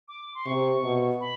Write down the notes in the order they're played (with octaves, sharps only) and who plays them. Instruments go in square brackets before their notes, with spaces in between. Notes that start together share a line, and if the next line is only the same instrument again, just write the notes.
[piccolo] D6
C6
[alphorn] C3 [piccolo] C#6
[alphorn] B2
[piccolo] B5